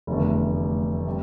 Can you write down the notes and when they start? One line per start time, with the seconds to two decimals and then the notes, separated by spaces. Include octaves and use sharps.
0.07 F1 E2 D3 A3
1.07 C3 G3